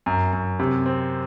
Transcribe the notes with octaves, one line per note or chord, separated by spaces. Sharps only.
F#2
F#2
C3
C4